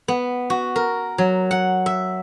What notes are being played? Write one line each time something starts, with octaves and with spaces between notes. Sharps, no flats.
B3
F#4
A#4
F#3
F#5
E5